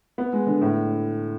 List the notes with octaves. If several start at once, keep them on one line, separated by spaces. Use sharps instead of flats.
B3
G#3
D3
A2